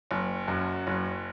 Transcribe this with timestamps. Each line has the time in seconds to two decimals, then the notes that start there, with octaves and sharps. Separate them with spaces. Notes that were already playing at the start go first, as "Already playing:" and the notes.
0.11 F#1
0.48 F#2
0.87 F#1